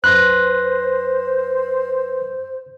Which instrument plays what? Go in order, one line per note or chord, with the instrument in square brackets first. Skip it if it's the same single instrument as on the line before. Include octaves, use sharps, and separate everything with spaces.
[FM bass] F#2 [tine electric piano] B4 C6 A#6 [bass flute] C5 [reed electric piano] F#6